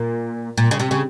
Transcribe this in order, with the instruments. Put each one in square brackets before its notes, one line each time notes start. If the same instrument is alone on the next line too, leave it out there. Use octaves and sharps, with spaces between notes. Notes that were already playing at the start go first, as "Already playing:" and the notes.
Already playing: [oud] A#2
A#2
C#3
C3
C#3